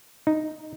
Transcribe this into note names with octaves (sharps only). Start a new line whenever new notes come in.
D#4